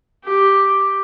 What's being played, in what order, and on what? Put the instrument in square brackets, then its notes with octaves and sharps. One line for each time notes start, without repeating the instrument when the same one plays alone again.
[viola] G4